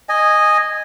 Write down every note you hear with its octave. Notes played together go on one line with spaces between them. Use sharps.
D#5 G#5